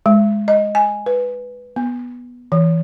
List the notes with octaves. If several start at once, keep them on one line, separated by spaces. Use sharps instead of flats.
G#3
D#5
G#5
B4
B3
E3